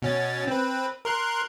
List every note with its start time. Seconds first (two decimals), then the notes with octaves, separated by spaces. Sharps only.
0.02 B2 C#4 A6
0.48 C4 B4
1.05 A#4 C6 F#6